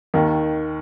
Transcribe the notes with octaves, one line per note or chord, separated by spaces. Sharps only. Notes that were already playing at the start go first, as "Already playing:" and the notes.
D#2 D#3